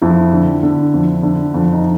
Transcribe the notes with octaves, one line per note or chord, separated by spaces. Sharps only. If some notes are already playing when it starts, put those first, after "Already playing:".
F2 E4
D3
D3
F2
D3
F2
D#4